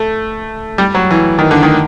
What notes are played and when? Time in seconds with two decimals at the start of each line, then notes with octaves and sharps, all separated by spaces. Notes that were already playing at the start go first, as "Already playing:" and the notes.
Already playing: A3
0.78 G3
0.95 F#3
1.11 E3
1.39 D#3
1.51 D3
1.63 D#3